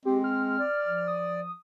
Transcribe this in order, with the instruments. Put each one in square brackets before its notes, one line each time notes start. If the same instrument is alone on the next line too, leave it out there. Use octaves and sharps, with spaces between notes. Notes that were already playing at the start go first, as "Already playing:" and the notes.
[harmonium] G#3 [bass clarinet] C4 [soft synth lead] G4
[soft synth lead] F6
[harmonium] D5
[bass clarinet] F3
[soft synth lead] D#6